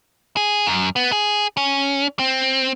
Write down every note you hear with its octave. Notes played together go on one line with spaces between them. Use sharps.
G#4
F#2
B3
G#4
C#4
C4